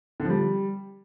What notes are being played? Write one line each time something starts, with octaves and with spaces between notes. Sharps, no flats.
D3
F3
G3